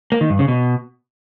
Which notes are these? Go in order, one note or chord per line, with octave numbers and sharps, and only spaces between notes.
A#3
D#3
G2
C#3
B2